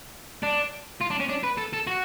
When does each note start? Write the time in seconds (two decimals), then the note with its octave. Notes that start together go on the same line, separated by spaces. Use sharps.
0.43 D4
1.01 F4
1.11 D4
1.20 C#4
1.29 D4
1.44 B4
1.58 A4
1.74 A4
1.88 F#4